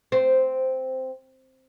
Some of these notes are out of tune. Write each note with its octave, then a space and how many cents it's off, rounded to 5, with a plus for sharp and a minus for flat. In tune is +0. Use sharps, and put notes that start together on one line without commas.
C4 -5